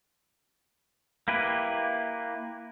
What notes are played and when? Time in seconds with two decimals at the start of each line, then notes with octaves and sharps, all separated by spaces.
1.28 A#3 E4 G4 B4